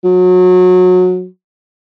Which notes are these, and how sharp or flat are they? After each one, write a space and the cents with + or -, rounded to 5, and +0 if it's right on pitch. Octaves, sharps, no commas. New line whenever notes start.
F#3 -25